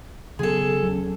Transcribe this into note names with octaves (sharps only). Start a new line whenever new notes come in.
C#3 F#3 B3 G#4 A4
D#1 F#3 C#4